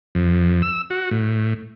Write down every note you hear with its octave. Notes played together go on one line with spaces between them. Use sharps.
F2
E6
F#4
A2